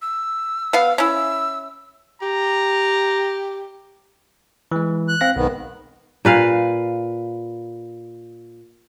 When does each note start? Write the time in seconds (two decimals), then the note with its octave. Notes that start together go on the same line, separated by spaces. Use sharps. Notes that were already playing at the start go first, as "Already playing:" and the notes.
0.02 E6
0.73 B3 F5
0.98 C#4 E4 E6
2.22 G4 A#5
4.72 E3 G#3
5.08 F#6
5.21 C4 F5 A#6
5.36 B1 G#2 D#3 B3
6.25 A#2 B4 F5